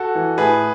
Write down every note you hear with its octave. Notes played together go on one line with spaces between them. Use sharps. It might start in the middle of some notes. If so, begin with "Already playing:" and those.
Already playing: F#4 A4
E3
A2 G#4 B4